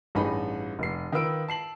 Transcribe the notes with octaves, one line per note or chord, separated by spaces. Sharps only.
A1 G2 D#4 G#4 D#5 B5
F1 C7
D#3 F4 B4 E6 D7
A5 C7 F#7